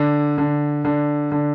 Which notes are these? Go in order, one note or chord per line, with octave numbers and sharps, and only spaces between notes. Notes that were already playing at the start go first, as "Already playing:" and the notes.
Already playing: D3
D3
D3
D3